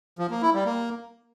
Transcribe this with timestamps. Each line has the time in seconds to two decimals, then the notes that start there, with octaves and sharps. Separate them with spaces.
0.19 F3
0.30 A#3
0.42 E4
0.54 G3
0.66 A#3